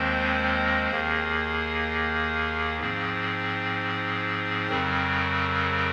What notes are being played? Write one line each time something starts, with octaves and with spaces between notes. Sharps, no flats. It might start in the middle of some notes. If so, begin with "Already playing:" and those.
Already playing: D#2 D#3 G#3 C4 C5
D#2 D#3 A#3 G#4
G#2 F3 C4 G#4
F2 C#3 F#3 C4 A#4